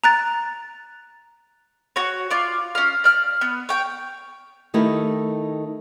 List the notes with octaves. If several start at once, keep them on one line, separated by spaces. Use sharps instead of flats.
A#5 F#6 A6
F#4 C#5
F4 D5
C#4 F5
D5 F6
B3
C#5 G5
D#3 A3 D#4 E4 G4 A#4